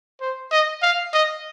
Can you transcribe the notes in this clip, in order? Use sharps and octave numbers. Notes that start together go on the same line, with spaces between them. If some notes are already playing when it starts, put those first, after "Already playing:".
C5
D#5
F5
D#5